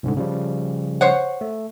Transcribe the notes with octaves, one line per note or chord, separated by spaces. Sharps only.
C2 G#2 D3
C#3 F3 G3
C5 C#5 F#5
A3